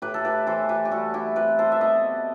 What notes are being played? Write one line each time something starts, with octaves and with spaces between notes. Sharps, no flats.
A2 G4 B4
A4
G4 B4
E3 A4 C5
G4 B4
G4
G3 F#4 A4
E4 G4
C4 G4 B4
A4 C5
E5
B2 B4 D#5